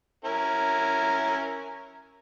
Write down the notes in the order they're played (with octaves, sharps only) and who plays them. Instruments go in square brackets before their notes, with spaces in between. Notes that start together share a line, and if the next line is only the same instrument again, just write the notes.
[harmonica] C#4 E4 A#4